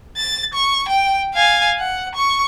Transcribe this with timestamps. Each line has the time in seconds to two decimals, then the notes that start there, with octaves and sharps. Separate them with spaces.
0.17 A6
0.54 C#6
0.89 G5
1.34 F5 G#5
1.80 F#5
2.15 C#6